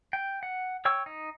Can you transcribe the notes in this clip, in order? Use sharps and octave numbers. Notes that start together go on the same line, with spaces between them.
G5
F#5
C#5 G5 C#6 E6
D#4